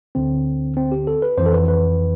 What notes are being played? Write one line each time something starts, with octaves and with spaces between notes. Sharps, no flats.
D2 D3 C4
C4
G4
A4
B4
F2 E3 C5
A4
B4
B4